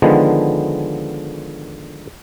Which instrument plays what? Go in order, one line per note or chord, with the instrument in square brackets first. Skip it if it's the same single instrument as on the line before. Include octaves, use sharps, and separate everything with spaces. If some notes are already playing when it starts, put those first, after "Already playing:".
[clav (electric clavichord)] D3 D#3 F3 G#3 B3